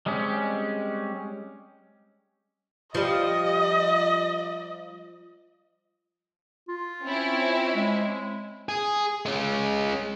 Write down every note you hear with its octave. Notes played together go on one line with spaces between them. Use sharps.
G3 G#3 C4 C#4
F3 G3 D#5
F4
C4 C#4 E4
G#3
G#4
G#3 C#4